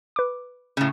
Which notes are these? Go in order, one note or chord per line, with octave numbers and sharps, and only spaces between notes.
B4 D6
A2 C#3